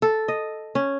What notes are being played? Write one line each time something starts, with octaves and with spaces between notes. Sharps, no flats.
A4
D#5
C#4